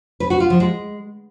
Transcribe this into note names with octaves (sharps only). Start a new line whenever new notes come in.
B4
F#4
F4
F3
G#3